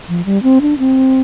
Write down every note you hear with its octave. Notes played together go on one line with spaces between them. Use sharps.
F3
G3
C4
D4
C4